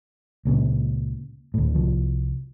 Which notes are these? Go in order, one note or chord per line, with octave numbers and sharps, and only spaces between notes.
C#2 A#2 C#3
D2 A2
C2 F3